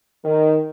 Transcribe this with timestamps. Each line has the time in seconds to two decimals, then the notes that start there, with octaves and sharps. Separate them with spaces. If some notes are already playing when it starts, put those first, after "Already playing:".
0.24 D#3